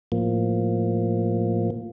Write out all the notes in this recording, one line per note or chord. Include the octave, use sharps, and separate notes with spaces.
A2 F3 A#3